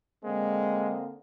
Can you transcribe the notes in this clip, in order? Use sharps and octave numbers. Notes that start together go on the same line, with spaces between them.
D3 G#3 A#3 C4